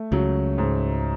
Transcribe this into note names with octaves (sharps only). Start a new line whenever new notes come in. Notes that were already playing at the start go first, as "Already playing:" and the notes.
Already playing: A3
C#2 C#3 F#3
G#2